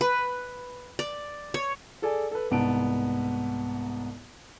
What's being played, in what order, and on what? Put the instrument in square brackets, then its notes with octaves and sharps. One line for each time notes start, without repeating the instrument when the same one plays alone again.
[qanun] B4
D5
C#5
[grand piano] G#4 A4 D5 G#5
A4 B4
C2 G#2 B3 A5 D7